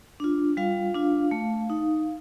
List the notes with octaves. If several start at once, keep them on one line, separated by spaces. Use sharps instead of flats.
D4 F4
G3 F4 F5
D4 F4
A3
D#4